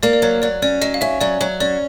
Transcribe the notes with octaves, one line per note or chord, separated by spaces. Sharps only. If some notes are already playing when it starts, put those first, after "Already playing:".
A#3 D5
D5
F#3 C#5
F#3 D5
C#4 D5
F#3 D#5
F5
C#4 E5
F#3 D5
F#3 C#5
C#4 D5